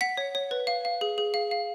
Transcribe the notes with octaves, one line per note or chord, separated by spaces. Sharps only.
F#5 B6
C#5
C#5
B4
F5
F5
G#4
G#4
F5
F5